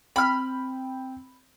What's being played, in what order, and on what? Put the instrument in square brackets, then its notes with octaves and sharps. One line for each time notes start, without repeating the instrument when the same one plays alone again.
[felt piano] C4 G5 [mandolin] B5 F6